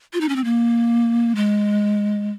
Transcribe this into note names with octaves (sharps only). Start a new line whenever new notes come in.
F4
D#4
C#4
C4
A#3
G#3